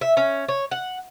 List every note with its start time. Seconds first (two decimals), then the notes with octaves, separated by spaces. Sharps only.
0.01 E5
0.17 C#4
0.48 C#5
0.71 F#5